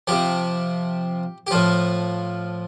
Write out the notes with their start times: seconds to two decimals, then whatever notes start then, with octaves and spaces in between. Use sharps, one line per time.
0.07 C3 F3 G4
1.47 G4
1.51 A2 F3 F4